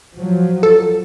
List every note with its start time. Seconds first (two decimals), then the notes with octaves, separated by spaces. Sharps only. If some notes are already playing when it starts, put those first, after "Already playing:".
0.15 F3 F#3
0.63 A4